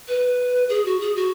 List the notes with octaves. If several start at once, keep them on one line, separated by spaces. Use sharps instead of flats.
B4
G#4
F#4
G#4
F#4